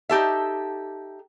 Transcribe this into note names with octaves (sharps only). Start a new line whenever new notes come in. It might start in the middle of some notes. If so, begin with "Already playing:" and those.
D#4 G4 A4 E5